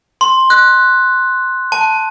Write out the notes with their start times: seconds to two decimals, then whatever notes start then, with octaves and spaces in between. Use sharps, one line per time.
0.21 C6
0.50 F#6
1.72 A5